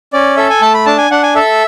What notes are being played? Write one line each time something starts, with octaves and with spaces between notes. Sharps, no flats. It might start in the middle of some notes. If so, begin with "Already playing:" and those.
C#4 D5
A4 E5
G#5
A3 A5
B5
D4 A5
G#5
D4 F#5
G#5
A4 E5